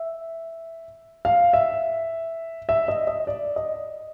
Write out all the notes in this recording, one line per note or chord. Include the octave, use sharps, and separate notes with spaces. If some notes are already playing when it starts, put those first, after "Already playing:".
Already playing: E5
F5
E5
E5
D#5
D#5
D5
D#5